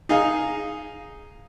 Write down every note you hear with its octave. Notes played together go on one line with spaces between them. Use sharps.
D#4 G#4 F5 G#5